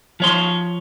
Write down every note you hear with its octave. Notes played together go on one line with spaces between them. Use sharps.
F3 C#5 C6